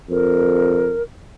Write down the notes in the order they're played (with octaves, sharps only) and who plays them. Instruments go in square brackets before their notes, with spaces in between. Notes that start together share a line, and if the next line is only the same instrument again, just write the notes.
[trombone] F2 [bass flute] A#4